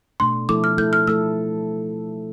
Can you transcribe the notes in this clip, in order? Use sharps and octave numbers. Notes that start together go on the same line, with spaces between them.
B2 A3 D4 C6
F3 A3 E4 A4 D6
F6
F3 A3 E4 A4 G6
F6
F3 A3 E4 A4 E6